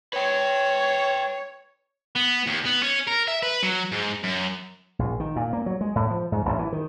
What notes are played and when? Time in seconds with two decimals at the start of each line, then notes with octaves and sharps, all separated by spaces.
0.13 B4 C#5 G5
2.15 B3
2.47 D#2
2.65 B3
2.83 C#4
3.08 A#4
3.28 E5
3.43 B4
3.63 F#3
3.92 G#2
4.24 F#2
4.99 A#1
5.20 D#3
5.36 A#2
5.53 A#3
5.66 F#3
5.81 G#3
5.96 A2
6.10 F3
6.32 G#2
6.45 A1
6.59 E3
6.72 D#3